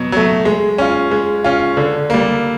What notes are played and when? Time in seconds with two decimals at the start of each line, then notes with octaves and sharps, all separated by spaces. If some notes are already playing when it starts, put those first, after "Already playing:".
Already playing: B2 F#3
0.12 F#3 A3
0.45 G#3
0.78 C#4 F4
1.11 G#3
1.44 C#4 F4
1.77 D3
2.10 G3 A#3